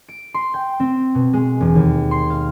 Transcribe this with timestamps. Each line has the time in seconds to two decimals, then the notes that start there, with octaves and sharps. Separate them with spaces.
0.09 D7
0.34 C6
0.54 G5
0.80 C4
1.15 B2
1.33 G#3
1.60 E1
1.75 D#2
2.11 C6
2.30 F5